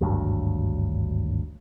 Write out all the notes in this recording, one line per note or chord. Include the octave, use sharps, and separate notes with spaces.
G#1 D2 G2 F#3